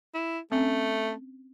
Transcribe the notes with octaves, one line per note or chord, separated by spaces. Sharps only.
E4
A3 C4 C#4